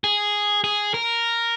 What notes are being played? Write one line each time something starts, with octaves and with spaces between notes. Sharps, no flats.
G#4
G#4
A#4